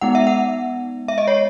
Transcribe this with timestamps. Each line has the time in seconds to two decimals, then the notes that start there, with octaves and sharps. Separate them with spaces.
0.01 G#3 B3 D#4 F#5
0.15 E5
0.27 F#5
1.08 E5
1.18 D#5
1.28 C#5